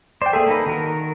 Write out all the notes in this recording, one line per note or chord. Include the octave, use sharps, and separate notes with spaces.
C5 D5 G5
A#3 G#4 A4 E5
A#3 D#4 B4
D#3 F#4 A#4